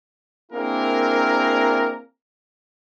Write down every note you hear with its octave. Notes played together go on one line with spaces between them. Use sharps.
A#3 C4 D4 E4 G#4 A#4